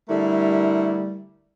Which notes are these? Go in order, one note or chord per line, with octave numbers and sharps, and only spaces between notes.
D3 G3 A3 E4 A#4